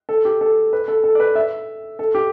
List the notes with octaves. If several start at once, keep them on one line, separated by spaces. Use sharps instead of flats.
A4
G4
A4
B4
A4
A4
D5
B4
E5
A4
G4